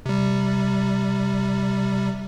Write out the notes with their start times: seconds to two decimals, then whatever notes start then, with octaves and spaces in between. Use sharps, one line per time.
0.06 C3 G3